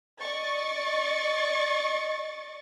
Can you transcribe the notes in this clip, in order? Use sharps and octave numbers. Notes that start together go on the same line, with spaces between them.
D5 D#5 C#6 A6